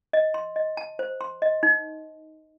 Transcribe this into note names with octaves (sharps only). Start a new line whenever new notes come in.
D#5
C6
D#5
A5
C5
C6
D#5
D#4